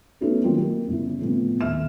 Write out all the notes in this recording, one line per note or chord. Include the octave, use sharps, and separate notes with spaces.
A3 B3 C#4 D#4 F#4 B4
D#3 F#3 A#3 C4 F4 G4
A#3 G4
G1 C#3 E4
A2 C3 F3 B3 C4
D#1 E5 F6 E7